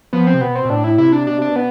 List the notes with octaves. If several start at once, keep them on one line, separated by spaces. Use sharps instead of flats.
F3 B3
C4
C3
B2 B3
C4
B2
A2 D4
E4
C3 E4
D4
B2 D4
C3 D4
B2
B3